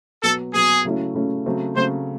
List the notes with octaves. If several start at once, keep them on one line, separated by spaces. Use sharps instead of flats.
B2 F#3 B3 A4
B2 F#3 B3 G#4
C#3 F#3 A3 C#4 E4
C#3 F#3 A3 C#4 E4
C#3 F#3 A3 C4
C#3 F#3 A3 C4 C5